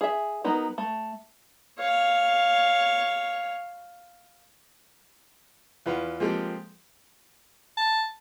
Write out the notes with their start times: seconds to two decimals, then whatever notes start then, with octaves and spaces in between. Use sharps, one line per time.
0.01 G#4 E5
0.44 F#3 B3 D#4 A#4
0.78 A3
1.79 C#5 F5
5.86 E2 F4 B4 F#5
6.20 F3 G#3 A#3 C4 G4 A4
7.77 A5